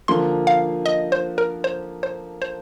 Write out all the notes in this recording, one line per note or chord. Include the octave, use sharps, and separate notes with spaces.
D3 F3 A#3 C6
F5
D#5
C5
A#4
C5
C5
C5